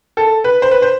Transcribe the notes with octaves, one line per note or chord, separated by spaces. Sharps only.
A4
B4
C5
B4
C5